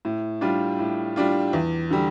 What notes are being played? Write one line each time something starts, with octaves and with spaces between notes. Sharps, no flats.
A2
G3 D4 F4
A2
G3 D4 F4
E2
D3 G3